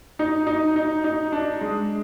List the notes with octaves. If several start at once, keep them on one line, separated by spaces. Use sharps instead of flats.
D#4
D#4
D#4
D#4
D4
G#3